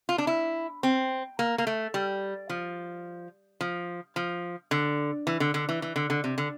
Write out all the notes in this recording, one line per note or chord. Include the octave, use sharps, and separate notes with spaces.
F4
D4
E4
C4
A#3
A#3
A3
G3
F3
F3
F3
D3
E3
D3
D3
E3
E3
D3
D3
C3
D3